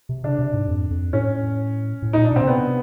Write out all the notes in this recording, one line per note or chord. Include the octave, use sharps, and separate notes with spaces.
C3
C#3 D4
C3
G#2
F2
F2
A2 C#4
A2
A#2 D#4
D4
B2 C4
C#3
C3 B3